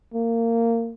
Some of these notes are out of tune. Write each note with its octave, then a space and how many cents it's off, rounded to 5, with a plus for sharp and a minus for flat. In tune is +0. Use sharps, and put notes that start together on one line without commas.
A#3 -20